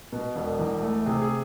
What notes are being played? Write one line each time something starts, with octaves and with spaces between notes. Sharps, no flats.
B2
E1
E2
A3
C3 G#4
G#4